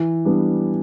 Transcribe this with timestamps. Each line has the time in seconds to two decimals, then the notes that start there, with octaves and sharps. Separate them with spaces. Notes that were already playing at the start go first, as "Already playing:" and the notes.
Already playing: E3
0.25 G3 B3 D4